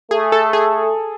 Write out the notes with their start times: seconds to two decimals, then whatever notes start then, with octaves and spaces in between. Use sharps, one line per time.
0.11 A3 G#4
0.32 A4
0.53 G#4